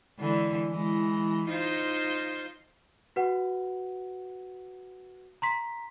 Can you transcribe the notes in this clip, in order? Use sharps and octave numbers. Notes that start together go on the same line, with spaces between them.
D3 E3 G#3
E3 G#3
D#4 F4 C5
F#4 B4 F#5
A#5 C6 B6